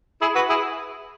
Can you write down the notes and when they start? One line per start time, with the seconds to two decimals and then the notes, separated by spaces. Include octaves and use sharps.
0.21 E4 G#4
0.35 F#4 B4
0.49 E4 G#4